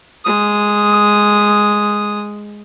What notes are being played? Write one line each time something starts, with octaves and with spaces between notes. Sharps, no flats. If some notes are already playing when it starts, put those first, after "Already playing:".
G#3 D#6